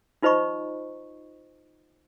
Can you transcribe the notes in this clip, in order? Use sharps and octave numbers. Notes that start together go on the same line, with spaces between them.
D#4 F4 C5 D#5 B5 C#6